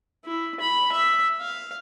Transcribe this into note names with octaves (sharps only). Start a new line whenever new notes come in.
E4
B5
E5
F5